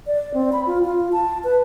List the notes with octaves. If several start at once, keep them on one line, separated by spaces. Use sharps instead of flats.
D5
C4
B5
F4
F4
A5
B4